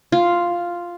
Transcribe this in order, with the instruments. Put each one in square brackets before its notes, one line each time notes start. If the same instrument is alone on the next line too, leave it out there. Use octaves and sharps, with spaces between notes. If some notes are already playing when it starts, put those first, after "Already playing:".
[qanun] F4